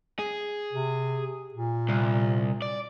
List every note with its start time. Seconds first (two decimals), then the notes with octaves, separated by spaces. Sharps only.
0.19 G#4
0.73 C3
1.54 A#2
1.89 C2
2.62 D5